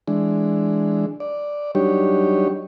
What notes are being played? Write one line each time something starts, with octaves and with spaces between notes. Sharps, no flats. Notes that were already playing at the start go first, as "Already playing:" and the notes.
E3 G#3 D4
D5
F#3 G3 D4 D#4 G4 C#5